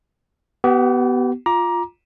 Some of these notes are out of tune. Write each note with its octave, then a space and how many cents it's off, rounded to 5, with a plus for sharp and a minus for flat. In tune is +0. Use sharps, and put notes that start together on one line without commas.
B3 +0 G4 -35
F4 +0 A#5 +20 D6 +0